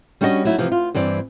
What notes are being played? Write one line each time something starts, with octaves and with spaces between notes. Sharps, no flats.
G3 C#4 D4 F#4 B4 D#5
F#3 A3 D#4 E4
C3 E3 F3
F4
G2 E3 C4 D5